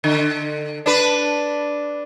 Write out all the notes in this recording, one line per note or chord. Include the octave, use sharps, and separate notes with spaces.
D3
D4 B4